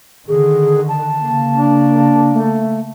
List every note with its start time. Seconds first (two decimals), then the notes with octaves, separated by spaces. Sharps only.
0.28 D3 D#3 G#4
0.88 A5
1.18 C#3 A#3
1.56 D4
2.32 A3